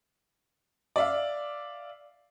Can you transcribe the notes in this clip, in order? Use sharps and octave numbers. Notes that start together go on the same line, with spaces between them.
D5 E5 F5